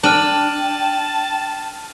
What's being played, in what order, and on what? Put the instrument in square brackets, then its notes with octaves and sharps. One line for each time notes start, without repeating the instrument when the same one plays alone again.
[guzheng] D4 [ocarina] G5 [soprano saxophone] A5 [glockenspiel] F6 D#7 F#7